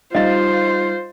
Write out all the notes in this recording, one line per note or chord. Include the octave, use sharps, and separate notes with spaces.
G3 D#4 F4 C5 D#5 F5 A6